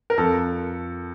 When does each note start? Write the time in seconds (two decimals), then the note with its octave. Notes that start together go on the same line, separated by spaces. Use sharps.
0.10 A#4
0.18 F2 A4